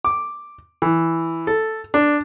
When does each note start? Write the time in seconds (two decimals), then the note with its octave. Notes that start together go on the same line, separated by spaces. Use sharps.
0.04 D6
0.82 E3
1.47 A4
1.94 D4